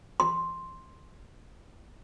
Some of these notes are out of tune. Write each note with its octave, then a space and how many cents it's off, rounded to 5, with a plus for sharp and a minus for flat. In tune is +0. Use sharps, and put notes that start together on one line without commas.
C6 +5